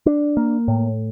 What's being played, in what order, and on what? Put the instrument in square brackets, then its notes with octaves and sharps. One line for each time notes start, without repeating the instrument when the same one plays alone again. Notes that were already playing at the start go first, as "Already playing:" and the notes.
[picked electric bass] D4
A#3
A2